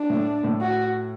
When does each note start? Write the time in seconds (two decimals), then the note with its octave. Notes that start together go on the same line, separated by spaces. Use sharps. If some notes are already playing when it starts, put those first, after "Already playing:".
Already playing: D4
0.10 A2 A3
0.43 A2 A3
0.61 F#4